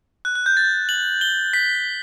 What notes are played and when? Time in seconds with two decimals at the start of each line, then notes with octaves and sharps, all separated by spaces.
0.25 F#6
0.35 F#6
0.46 G6
0.57 A6
0.89 F#7
1.21 G7
1.54 B6